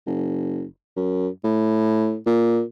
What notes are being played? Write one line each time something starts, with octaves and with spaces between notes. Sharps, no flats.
F#1
F#2
A2
A#2